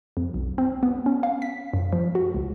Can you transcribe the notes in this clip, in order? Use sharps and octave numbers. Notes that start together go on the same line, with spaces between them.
F2
B1
C4
B3
C#4
F5
B6
F#2
F3
F#4
C#2